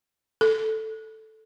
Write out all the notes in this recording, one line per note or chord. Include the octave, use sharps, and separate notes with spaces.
A4